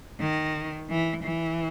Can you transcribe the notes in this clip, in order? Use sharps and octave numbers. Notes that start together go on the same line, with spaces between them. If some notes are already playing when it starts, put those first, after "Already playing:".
D#3
E3
E3